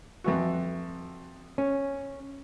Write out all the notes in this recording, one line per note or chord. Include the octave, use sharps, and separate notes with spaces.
F2 E3 F#4
C#4